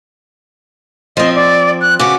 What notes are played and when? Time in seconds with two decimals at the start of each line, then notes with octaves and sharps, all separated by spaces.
1.17 F3 C4 D#5
1.35 D5
1.81 F#6
1.99 C#3 B3 F#4 D6